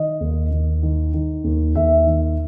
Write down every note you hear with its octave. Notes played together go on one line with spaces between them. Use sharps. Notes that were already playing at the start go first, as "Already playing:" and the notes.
Already playing: D#3 D#5
D#2
D#2
D#3
D#3
D#2
D#2 E5
D#3